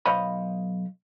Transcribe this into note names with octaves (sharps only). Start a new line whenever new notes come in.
B1 C5 C#5 D#5 F5 B5